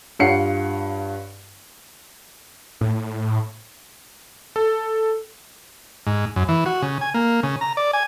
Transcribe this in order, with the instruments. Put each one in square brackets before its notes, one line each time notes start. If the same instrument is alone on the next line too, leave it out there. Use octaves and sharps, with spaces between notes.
[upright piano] G2 F4 C#5 F#5 C7 C#7
[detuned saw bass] A2
[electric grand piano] A4
[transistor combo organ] G#2
F#2
E3
F#4
C#3
G#5
A#3
C#3
A#5
D5
G#5